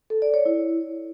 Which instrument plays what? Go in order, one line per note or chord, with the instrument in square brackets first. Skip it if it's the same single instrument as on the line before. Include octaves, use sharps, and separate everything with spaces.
[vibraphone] A4
D5
C#5
E4